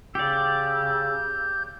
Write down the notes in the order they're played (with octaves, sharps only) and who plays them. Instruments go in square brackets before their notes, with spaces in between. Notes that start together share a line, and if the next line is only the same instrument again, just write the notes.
[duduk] C#3 [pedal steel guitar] G4 D5 [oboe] E6 [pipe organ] G6